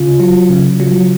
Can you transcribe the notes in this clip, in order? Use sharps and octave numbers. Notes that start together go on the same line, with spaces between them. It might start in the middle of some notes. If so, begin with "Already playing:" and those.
Already playing: C#3 F4
F#3
C#3
F#3